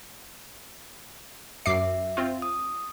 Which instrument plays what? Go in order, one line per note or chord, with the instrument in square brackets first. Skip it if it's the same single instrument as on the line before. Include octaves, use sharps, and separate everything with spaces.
[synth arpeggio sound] F#2 D6 C7 [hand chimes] E5
[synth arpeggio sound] C4 F4
[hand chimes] D#6